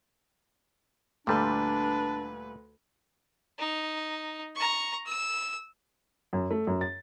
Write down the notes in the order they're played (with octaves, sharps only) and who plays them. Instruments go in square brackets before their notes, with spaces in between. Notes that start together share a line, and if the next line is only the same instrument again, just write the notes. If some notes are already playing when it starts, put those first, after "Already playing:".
[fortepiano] D2 A4 C6 [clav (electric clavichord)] A#2 G3 [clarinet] D4 [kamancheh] B4
[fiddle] D#4
A#5 C#6
E6
[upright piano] F#2
A3
F#2
A6